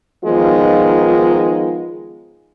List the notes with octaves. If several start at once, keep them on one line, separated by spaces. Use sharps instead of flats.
D#3 F3 G#3 B3 D#4 F4